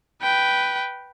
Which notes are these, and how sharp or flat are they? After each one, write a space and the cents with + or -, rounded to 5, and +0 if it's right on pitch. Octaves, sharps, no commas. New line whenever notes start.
B4 +0 G5 -5